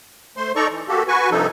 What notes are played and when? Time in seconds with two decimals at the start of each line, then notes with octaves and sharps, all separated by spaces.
0.37 A3 C5 C6
0.56 D#4 A4 D5 A#5 C#6
0.71 E3
0.88 A#3 F#4 G4 A4
1.08 F#4 B4 G#5 C#6
1.31 G2 C3 F3 D#4 A4